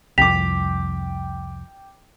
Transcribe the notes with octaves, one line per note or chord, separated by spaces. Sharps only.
C2 F2 G5 D6 B6 F7